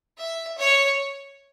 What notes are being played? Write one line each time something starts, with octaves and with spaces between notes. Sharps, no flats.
E5
C#5